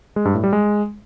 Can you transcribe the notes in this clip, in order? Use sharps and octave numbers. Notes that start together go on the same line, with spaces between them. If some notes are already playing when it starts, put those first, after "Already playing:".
G#3
G2
A2
G3
G#3